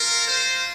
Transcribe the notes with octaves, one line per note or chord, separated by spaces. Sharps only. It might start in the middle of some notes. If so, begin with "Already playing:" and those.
Already playing: A#3 F4 A#4
C5